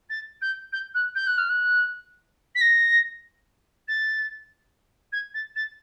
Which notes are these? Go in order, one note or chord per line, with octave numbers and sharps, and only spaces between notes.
A6
G6
G6
F#6
G6
F#6
F6
F#6
B6
A#6
A6
G#6
A6
A6